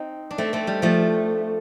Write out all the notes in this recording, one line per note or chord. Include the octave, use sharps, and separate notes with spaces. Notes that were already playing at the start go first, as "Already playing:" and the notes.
Already playing: C4 D#4
D4
A3 C4
A3 C4
G3
F3 A3